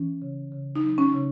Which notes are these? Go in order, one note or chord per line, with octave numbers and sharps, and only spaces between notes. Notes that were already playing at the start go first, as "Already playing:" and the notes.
Already playing: E3 C#4
C#3
C#3
D#4
F#3
C#4
C#3